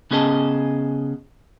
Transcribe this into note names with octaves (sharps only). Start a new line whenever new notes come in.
C#3 B3 C#4 G#4 D#5 A5